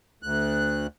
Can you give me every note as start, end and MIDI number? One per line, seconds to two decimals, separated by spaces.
0.23 0.87 38
0.23 0.87 90